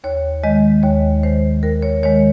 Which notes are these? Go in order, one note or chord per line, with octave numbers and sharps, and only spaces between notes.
D#2 C#5
D#3 G#3 D#5
D#2 C#5
D#3 G#3 C5
D#2 A#4
C#5
D#3 G#3 C#5